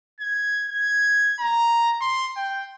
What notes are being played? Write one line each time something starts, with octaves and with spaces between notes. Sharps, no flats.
G#6
G#6
A#5
C6
G5